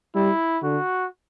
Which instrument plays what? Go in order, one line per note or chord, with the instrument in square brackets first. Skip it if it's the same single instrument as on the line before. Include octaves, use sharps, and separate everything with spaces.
[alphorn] G3 [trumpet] E4
[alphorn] D3 [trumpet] F#4